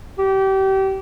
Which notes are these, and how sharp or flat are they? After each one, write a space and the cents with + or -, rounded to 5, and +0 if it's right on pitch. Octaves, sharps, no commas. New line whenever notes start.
G4 -30